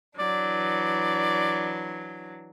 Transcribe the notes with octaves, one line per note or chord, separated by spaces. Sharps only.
E3 F#3 D4 D5